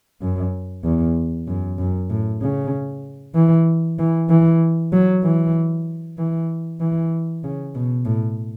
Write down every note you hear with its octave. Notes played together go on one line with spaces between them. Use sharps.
F#2
E2
F#2
F#2
A2
C#3
E3
E3
E3
F#3
E3
E3
E3
C#3
B2
A2